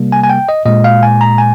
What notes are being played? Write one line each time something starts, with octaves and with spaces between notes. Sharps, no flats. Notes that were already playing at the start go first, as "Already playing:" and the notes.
Already playing: C3 G3 A#3
G#5
G#5
G5
D#5
A#2 G#3 D#5
F5
G#5
A#5
G#5